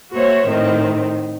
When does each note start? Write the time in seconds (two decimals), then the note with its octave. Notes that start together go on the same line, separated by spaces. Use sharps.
0.12 A#3 F#4 C5 C#5 E5
0.47 A2 D#3 C4 D#4